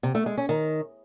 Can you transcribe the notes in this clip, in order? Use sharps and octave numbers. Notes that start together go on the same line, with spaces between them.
C3
A3
G#3
C#4
D#3